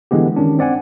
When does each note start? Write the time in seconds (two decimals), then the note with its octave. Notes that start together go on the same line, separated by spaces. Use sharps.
0.11 D3 E3 G#3 B3 G4
0.36 D#3 C#4 D4
0.59 C4 D5 F#5 G#5